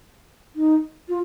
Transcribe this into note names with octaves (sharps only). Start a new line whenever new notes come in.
D#4
F4